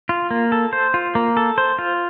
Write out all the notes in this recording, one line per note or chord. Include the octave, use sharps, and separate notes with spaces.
F4
A#3
A4
C5
F4
A#3
A4
C5
F4